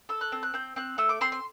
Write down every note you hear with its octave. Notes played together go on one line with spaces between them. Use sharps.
A4 E6
F#6
C4
F#6
C4 G6
C4 F#6
A3 E6
D6
C4 C6
C6